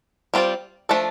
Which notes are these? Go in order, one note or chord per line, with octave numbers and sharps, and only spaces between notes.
G3 C4 F4 B4 D5
F3 A3 D4 A4 D5